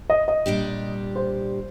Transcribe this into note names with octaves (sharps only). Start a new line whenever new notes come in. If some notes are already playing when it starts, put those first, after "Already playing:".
D#5
D#5
A#2 G3 D4 G4
C5